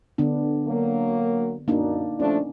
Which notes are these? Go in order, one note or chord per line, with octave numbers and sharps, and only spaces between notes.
D3 B3 D4
F#3 A#3
F#2 A#3 D4 D#4
F3 A3 C#4 D4